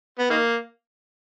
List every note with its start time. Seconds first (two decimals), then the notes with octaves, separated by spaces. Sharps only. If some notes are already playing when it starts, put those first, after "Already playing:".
0.19 B3
0.30 D#3 A#3